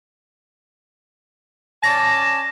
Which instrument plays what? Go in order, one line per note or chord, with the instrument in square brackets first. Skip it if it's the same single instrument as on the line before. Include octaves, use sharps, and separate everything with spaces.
[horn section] C#4 D5 A5 [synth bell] A#6